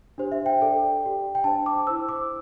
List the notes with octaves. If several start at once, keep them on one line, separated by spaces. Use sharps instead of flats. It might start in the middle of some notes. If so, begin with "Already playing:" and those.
D4 G4 C5
E5
G5
D4 A4 D5
G4 D5
G5
D4 C5 A5
D6
E4 C5 E6
D6